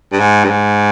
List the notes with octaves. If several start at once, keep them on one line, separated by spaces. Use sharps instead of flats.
G2
G#2
G2
G#2